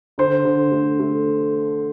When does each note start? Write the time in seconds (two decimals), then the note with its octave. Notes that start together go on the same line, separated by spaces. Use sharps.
0.18 D3 C5
0.45 D3
0.71 A3
0.99 A3